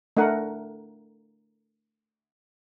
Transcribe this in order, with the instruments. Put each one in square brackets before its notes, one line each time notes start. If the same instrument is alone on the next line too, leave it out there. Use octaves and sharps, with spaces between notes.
[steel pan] A3 D4 A#4 F#5